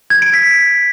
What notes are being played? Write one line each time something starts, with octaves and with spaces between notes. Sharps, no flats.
G#6
D7
B6